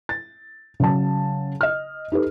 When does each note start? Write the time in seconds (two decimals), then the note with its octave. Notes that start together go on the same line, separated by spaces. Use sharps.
0.09 A6
0.80 C#3 F#3 A5
1.61 D#5 F6
2.12 D#4 G4 A4 B4